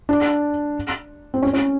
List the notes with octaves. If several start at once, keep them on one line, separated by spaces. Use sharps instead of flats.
D4
C4
C#4
C#4